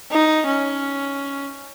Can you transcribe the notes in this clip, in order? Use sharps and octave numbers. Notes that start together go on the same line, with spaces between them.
D#4
C#4